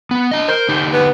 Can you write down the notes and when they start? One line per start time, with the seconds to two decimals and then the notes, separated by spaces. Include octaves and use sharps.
0.11 B3
0.31 D4 D#5
0.48 A#4 C5
0.69 D3 D#4 G4
0.93 B3